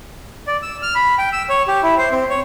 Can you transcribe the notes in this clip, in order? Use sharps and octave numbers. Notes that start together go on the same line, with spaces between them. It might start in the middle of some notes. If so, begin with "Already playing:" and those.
D5
E6
F6
B5
G5
E6
C#5
G4
E4
C5
C4
C#5